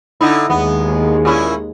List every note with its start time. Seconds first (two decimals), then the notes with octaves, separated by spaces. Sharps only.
0.21 D3 D#4 E4
0.50 D#2 G#3 B3
1.25 A#2 C#4 E4